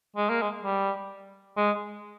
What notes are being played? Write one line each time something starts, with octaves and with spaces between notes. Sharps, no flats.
G#3
A#3
G#3
G3
G#3